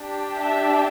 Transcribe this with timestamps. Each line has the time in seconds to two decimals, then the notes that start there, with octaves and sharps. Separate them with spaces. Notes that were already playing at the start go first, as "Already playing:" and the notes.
Already playing: D4 G4
0.38 E5